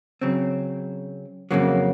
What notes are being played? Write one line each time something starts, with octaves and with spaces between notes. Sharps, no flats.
C#3 F#3 C4
F2 C#3 F#3 A#3